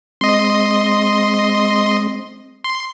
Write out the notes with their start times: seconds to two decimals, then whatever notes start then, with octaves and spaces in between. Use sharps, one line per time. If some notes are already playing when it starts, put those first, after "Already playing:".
0.21 G#3 C4 D#5 C6
2.64 C6